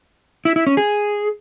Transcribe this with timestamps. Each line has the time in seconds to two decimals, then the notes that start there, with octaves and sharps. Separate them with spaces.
0.45 E4
0.56 E4
0.67 C#4
0.77 G#4